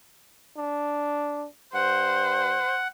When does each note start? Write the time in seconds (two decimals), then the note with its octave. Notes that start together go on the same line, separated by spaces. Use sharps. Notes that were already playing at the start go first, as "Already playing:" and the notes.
0.57 D4
1.74 G2 C5 F#5